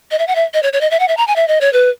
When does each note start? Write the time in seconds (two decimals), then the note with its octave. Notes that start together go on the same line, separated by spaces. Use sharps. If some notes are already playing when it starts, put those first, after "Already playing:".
0.11 D#5
0.19 E5
0.28 F#5
0.35 E5
0.54 D#5
0.63 C#5
0.73 C#5
0.81 D#5
0.91 E5
1.00 F#5
1.08 E5
1.17 A#5
1.27 G#5
1.36 E5
1.48 D#5
1.61 C#5
1.73 B4